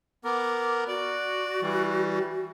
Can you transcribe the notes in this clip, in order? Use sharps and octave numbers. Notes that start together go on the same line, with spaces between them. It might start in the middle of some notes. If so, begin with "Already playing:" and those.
B3 A#4 D6
F#4 D5
E3 G3